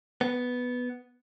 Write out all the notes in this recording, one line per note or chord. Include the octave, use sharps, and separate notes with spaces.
B3